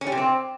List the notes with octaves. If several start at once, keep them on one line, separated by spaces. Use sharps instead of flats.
C#4
G3
C3
C4